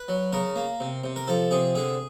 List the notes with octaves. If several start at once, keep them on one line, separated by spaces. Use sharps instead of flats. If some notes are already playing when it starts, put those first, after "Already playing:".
Already playing: B4
F#3
C#3 A#4
A#3
C3
C3
A#4
F3 A4
C3 G#4
D3 G#4